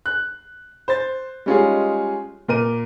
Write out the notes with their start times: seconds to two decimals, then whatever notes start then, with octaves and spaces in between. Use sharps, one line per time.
0.06 F#6
0.88 C5 A6
1.46 G3 G#3 C#4 D#4 F4 G#4
2.48 A#2 A#4 D#7